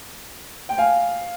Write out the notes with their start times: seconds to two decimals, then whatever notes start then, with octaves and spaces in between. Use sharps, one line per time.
0.69 G5
0.78 F5 G#5